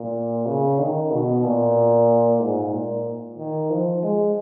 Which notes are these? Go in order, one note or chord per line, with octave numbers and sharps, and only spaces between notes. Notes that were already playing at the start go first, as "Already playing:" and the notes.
Already playing: A#2
C#3
D#3
B2
A#2
G#2
A#2
D#3
F3
G#3